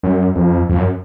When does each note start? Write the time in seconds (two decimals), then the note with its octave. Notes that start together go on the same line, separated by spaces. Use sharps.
0.03 F#2
0.36 F2
0.69 F2
0.77 F#2